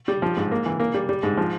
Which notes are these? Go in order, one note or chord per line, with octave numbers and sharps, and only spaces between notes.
G3
F3
G#2
A#3
E3
A#3
G3
G3
G#2
F3